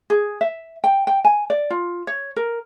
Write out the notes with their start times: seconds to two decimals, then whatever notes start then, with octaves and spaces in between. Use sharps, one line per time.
0.10 G#4
0.41 E5
0.84 G5
1.07 G5
1.25 G#5
1.50 D5
1.70 F4
2.07 C#5
2.36 A#4